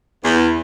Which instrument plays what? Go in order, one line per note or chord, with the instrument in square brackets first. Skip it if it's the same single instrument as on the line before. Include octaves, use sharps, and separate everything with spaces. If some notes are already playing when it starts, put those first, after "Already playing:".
[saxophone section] E2